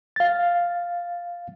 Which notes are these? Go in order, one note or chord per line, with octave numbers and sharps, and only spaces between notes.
F5 A6